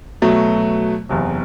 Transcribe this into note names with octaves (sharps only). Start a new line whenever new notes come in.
B2 F#3 A3
F#1 E2 C3